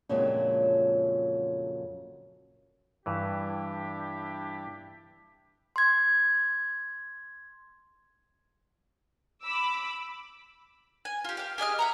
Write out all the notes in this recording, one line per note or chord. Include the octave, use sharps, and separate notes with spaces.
F2 A#2 C#3 F#3 G#3 D4
G2 E3 D4 E4 G4
C6 G#6
B5 D6 E6
G#5
F4 G4
G4 F5
G4 G#4 D#5 F6
E5 F#5 A#5